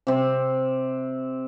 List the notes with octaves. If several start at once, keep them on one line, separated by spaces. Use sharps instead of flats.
C3 C4